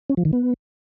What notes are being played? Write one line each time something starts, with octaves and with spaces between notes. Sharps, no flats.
C#4
F3
D#3
B3